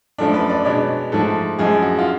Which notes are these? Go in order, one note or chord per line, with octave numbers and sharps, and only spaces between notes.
F#2 F3 A3 D4
B4
D5
B2 G#3 B3 D4 C#5
G#2 F3 A3 A4
F#2 F3 G#3 G#4
F#4
F4